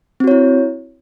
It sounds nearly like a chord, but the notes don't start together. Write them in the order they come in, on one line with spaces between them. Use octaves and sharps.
C4 F#4 C#5 E4